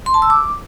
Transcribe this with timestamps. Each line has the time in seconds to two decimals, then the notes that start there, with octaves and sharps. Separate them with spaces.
0.06 C6
0.14 A5
0.22 E6
0.30 D6